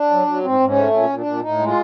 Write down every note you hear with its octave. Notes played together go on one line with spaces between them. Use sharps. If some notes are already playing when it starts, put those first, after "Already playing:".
Already playing: D4
F#3
F#3
G#2 C4
G#2
C#4
A3
A#2 C#4
A#2
D4
A#2
A2 D#4
G#3
F4